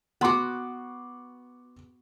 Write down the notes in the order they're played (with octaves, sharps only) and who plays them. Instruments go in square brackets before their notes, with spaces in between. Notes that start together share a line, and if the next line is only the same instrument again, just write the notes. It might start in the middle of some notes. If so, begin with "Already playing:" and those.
[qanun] B3 F#4 [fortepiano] F#5 C6 D6